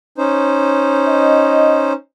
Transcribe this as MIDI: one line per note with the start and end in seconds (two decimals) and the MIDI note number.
0.18 1.93 61
0.18 1.93 63
0.18 1.93 72
1.08 1.90 75